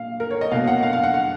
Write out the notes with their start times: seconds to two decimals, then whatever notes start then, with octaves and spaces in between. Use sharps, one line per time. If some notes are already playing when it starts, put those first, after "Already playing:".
Already playing: A#2 F5
0.20 A#4
0.31 C#5
0.41 D#5
0.51 B2 A#3 F5
0.67 F#5
0.83 F5
0.93 F5
1.04 F#5
1.14 F#5